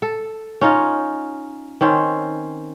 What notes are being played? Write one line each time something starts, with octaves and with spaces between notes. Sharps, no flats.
A4
C#4 D#4 F4
D#3 C4 C#4 C5